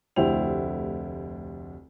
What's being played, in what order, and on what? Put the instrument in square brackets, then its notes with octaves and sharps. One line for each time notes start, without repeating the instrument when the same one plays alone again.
[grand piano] F1 D2 E4 G4 C5 F7